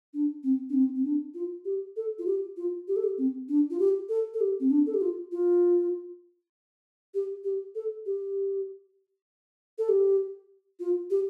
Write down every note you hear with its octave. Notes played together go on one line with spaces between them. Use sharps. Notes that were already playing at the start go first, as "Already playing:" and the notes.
D4
C4
D4
C4
C4
D4
F4
G4
A4
F4
G4
F4
G4
A4
G4
C4
D4
F4
G4
A4
A4
G4
C4
D4
A4
G4
F4
F4
G4
G4
A4
G4
A4
G4
F4
G4